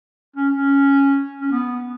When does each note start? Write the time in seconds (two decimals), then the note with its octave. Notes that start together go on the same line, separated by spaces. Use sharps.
0.36 C#4
0.54 C#4
1.41 C#4
1.51 B3